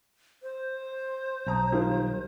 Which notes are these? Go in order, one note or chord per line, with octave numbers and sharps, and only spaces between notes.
C5
B1 A5 A#5 D#6
D#3 G3 F4